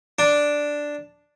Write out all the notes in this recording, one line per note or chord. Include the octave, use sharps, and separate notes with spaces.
D4